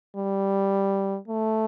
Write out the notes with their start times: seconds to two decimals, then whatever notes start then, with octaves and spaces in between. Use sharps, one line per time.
0.16 G3
1.28 A3